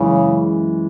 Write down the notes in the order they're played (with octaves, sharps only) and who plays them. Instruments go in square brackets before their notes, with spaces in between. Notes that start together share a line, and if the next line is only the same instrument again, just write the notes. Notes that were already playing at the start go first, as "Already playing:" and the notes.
Already playing: [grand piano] F#2 E3 G#3 [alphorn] C#3